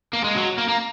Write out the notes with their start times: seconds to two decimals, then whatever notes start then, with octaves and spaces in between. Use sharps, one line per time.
0.13 A#3
0.24 G#3
0.36 F#3
0.58 A#3
0.69 A#3